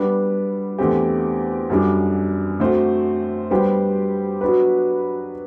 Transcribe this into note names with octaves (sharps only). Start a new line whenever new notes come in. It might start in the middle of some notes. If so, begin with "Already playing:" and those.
Already playing: G3 B3 D4
E2 D3 A3 C4 G4
F#2 D3 G3 D4
D3 A3 C4 F#4 C5
G3 B3 D4 G4 C5
F#3 B3 D4 F#4 B4